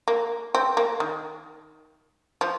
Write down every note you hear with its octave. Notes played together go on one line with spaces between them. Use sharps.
A#3
C4
A#3
D#3
F3